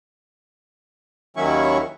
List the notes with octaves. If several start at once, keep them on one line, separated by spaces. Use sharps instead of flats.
D#2 D#3 F#3 C#4 E4 C#6